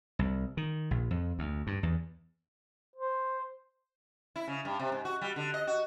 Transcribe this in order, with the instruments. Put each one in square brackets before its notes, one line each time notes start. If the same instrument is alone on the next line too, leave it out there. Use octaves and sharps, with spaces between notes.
[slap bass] C2
D#3
A#1
F2
D2
G2
E2
[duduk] C5
[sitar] E4
C#3
G2
C3
G#2
F#4
G3
D3
D#5
F#4